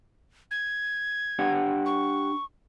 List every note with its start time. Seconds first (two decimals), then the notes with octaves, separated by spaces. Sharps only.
0.51 G#6
1.39 D4 G4 F#5
1.86 C#6